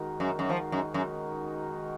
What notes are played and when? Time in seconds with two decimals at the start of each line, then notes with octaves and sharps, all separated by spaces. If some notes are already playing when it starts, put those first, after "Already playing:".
Already playing: D#3 G#3 D#4 F#4 A#4
0.20 F#2
0.39 F#2
0.49 F3
0.72 F#2
0.94 F#2